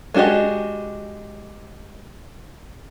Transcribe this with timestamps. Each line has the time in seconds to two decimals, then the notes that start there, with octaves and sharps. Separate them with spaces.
0.14 G#3 D4 F#4 G4 D#5